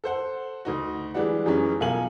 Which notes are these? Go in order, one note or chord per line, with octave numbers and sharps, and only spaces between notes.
A4 C5 F#5
D2 D#4 F#4
E3 G3 G#3 D4 D5 F#5
F#2 E3 G3 G#3 C#4 D#4
B1 F4 A4 A#4 G#5 F#7